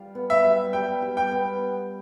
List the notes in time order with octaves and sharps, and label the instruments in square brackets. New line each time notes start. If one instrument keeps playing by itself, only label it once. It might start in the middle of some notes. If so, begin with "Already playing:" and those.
Already playing: [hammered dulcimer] G3 F4
B3
[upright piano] E5
[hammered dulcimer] G3
[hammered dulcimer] G3 [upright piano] G5
[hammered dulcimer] G3
[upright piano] G5
[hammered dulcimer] B3